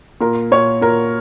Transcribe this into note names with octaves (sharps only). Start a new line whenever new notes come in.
A#2 A#4
A#2 C#5
A#2 A#4